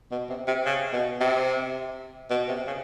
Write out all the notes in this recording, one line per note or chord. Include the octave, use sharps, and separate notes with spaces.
B2
C3
C3
C#3
B2
C3
B2
C3
C#3